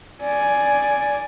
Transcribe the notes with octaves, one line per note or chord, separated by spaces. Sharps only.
D5 G#5